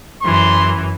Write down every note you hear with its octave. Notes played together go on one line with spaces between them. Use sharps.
F#2 E3 C6